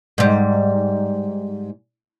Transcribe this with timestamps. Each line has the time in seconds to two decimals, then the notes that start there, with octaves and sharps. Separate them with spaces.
0.18 G#2 G3